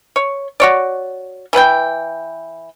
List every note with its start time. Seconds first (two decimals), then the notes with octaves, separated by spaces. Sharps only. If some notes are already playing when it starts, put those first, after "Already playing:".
0.16 C#5
0.60 F#4 C#5 D5
1.53 E3 B4 F#5 G5